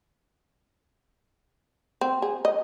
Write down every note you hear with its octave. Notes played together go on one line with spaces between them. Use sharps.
C4
G#4
D#5